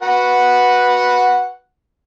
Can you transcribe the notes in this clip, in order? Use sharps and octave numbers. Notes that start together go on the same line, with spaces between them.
F#4 B4 F#5